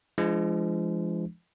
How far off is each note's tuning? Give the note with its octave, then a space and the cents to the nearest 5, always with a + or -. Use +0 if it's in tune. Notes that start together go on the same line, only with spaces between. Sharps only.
F3 -35 G#3 +0 D4 +0